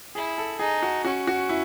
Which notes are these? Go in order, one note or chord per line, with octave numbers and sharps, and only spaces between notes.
E4 G#4
A4
D#4 G#4
F#4
C#4 F#4
F#4
E4